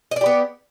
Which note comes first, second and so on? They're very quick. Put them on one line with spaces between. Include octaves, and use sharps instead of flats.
D#5 D5 G4 B3